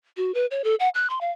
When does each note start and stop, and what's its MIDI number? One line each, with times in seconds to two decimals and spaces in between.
0.17 0.34 66
0.34 0.46 71
0.51 0.62 73
0.64 0.75 69
0.80 0.89 78
0.95 1.10 90
1.10 1.19 84
1.21 1.31 77